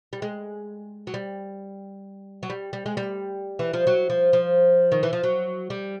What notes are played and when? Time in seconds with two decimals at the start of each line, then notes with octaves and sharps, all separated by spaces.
0.13 G3
0.22 G#3
1.07 F#3
1.14 G3
2.43 F#3
2.50 G3
2.73 G3
2.86 G#3
2.97 G3
3.59 E3
3.73 F3
3.87 F#3
4.10 F3
4.33 F3
4.92 D#3
5.03 E3
5.13 F3
5.23 F#3
5.70 G3